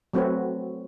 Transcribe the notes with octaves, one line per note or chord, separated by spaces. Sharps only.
F#3 A3 C4 F#4 B4 C#5